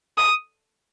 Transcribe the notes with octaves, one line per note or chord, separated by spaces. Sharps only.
D#6